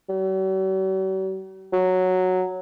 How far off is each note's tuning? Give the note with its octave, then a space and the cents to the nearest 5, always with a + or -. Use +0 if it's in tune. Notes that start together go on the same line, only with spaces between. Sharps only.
F#3 +45
F#3 -5